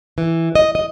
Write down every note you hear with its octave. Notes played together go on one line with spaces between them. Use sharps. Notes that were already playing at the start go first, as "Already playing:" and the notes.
E3
D#5
D#5